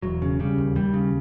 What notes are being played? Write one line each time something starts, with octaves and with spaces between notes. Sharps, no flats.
E1 F#3
C#3
C#3 G3
D#2
D#2 G3
C#3